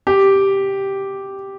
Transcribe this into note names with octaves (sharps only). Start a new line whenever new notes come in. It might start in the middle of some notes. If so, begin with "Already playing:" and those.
G4